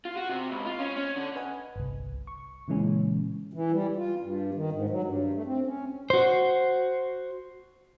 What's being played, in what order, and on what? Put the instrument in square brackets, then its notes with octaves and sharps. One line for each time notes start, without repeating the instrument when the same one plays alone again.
[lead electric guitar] F4
F#4
C3
C#2
F4
C#4
C#4
D3
[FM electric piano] B4 D#5 F#5 G#5
G1 C2
C#6
A#2 C#3 E3 G#3 C#4
[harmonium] E3
G3
F4
G2
D#3
G#2
F#3
G2
A3
C4
C#4
[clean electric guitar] F#4 C5